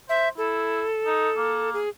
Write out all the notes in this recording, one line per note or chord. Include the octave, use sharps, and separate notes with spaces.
C5 E5
E4 A4
D#4
A#3
G#4